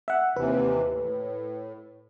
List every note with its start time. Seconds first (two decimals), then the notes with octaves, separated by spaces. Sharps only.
0.08 E5 F#5
0.36 D#2 C3 E3 B4
0.91 A2